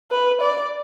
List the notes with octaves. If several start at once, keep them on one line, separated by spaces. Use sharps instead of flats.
B4
D5